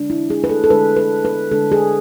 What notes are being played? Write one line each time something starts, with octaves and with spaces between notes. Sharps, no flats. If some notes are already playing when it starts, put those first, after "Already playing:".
Already playing: D3 G#3 D4
E4
G#4
B4
A4
A4
D3 G#3 D4 B4
B4
B4
D3 G#3 D4 A4
G#4